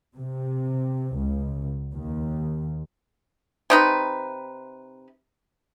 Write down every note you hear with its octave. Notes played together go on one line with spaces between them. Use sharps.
C3
C#2
D#2
C3 D#4 B4